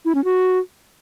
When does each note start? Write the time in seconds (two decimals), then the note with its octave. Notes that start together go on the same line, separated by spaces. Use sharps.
0.05 E4
0.15 C#4
0.24 F#4